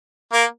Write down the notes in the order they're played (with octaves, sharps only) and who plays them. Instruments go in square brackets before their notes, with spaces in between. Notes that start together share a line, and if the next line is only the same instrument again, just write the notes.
[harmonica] A#3 A#4